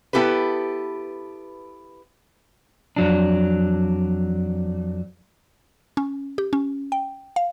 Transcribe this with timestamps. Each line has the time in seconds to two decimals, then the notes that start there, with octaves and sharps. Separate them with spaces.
0.13 B3 E4 G4 A4 B4
2.96 F2 F#3 D4
5.97 C#4
6.38 G4
6.53 C#4
6.92 G5
7.36 F5